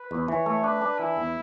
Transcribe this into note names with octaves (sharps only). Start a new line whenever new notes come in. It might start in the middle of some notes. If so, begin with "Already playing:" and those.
Already playing: B4
E2
E3 C#5
A3
D4 B4
D4
E3 E4
E2